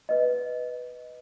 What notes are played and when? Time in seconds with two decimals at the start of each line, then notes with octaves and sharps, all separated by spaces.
0.09 B4 D#5